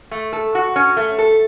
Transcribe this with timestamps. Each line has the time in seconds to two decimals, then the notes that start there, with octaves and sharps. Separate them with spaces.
0.11 A3
0.33 A4
0.55 F#4
0.76 C#4
0.97 A3
1.18 A4